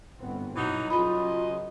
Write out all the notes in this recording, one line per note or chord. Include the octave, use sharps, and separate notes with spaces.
G1 B3 C4
G2 B2 E3 F#3 D#4
F#2 C#3 F#3 F4 D#5 B5